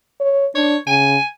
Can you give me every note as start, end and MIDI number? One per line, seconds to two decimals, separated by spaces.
0.20 0.47 73
0.55 0.76 62
0.55 0.77 73
0.87 1.17 49
0.87 1.25 80